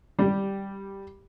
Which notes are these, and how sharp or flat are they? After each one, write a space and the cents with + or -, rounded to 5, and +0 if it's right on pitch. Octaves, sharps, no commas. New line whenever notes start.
G3 +0 G4 +0